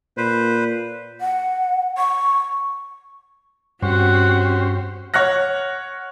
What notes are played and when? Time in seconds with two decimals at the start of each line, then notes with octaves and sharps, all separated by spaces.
0.17 A#2 B4 C5
1.21 F#5
1.98 C#6
3.82 G2 C4 C#4 F#4 G4 C5 F#5
5.14 C#5 F#5 F6 F#6 A#6